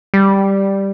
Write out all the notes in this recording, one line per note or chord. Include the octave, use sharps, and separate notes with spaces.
G3